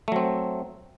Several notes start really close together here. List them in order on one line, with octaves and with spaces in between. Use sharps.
A3 F#3 C4